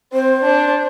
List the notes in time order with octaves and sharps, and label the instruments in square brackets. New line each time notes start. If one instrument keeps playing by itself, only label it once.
[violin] C4 [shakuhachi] C5
[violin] D4